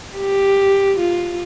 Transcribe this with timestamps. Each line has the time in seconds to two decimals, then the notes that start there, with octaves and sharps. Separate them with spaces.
0.17 G4
1.00 F4